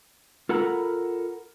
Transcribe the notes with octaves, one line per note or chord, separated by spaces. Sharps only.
F4 A4 A#4 F#5 A#5 B5